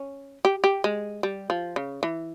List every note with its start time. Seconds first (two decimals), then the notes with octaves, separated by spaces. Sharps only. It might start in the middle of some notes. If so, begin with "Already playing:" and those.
Already playing: C#4
0.45 G4
0.64 G4
0.84 G#3
1.23 G3
1.50 F3
1.76 C#3
2.03 E3